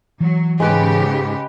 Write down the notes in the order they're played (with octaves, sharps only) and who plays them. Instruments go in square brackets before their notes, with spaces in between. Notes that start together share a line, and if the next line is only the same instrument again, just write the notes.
[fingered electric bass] E3 [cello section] F#3
[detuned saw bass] G#2 [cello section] C#3 G4 [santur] G#3 B4